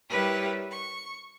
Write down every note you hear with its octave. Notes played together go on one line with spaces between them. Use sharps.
G3 E4 G4 A#4 B4 C#5
C#6